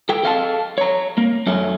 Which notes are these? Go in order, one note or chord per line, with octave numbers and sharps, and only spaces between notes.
A4 G5
A4 F5 G5 A5
C#5 A#5
A#3
F#2 A3 C#4